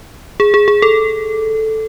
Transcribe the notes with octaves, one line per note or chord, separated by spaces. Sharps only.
G#4
G#4
G#4
A4